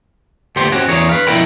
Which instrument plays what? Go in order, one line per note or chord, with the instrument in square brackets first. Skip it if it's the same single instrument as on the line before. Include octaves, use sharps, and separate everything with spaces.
[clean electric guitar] D2 A#2 B3 G4 C6
C4 C#4 F#4 G4
E2 G#4 A#4 C#5
B4 F5
B2 F3 E4 A#4 G5 B5